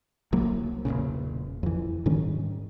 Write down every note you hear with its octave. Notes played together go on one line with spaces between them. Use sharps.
C2 F#3 A#3
E1 C2 A#2 C#3
F2 E3
G#2 D#3 G3 C#4